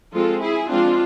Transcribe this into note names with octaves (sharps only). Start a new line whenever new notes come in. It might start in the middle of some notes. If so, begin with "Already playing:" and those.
F3 G#3 C4 F4 A4
E4 G#4
F3 G#3 C4 D4 F4